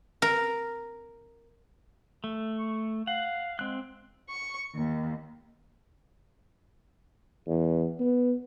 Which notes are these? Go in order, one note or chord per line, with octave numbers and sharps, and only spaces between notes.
A#4
A3
C#6
F5 F#5
G#3 C4 F#6
C#6
D#2
E2
B3